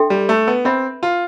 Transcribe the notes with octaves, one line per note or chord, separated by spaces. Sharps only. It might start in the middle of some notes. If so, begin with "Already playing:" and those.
Already playing: D4 A4 E5 G5 C6
G3
A3
B3
C4 B4 E5 B5
F4